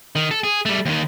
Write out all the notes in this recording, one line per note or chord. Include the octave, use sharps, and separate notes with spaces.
D#3
A4
G#4
G3 A3
D#2 D#3